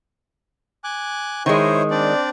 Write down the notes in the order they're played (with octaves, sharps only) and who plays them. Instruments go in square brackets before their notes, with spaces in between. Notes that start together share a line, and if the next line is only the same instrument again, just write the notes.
[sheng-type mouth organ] G#5 D6 F#6
[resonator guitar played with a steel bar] D#3 G#3 [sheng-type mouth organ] E4 C5 C#5
[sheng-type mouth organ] C4 D4 D5